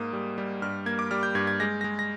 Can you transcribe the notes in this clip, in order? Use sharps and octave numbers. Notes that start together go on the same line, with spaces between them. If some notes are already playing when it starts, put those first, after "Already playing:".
Already playing: G#2 A#3 D#6
G3
G3
G2 F6
A#3 G#6
D6
G3 F6
G6
G2 G#6
G#6
G#3 A#6
G#3 A#6
A#6